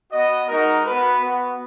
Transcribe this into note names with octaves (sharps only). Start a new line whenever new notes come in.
B3 F#4 D#5
G#3 D#4 F#4 A#4
B3 F#4 B4
B3 F#4